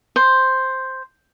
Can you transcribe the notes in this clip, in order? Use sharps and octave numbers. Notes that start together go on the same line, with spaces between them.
C5